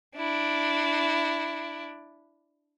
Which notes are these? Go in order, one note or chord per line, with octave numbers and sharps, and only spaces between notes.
D4 E4